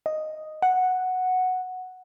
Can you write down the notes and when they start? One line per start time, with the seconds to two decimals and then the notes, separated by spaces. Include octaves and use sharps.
0.06 D#5
0.62 F#5